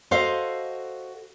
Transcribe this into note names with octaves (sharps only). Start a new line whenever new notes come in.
F#4 A4 C5 D#5 F5